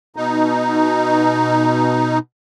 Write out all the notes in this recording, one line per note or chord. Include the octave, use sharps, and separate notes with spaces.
B2 D#4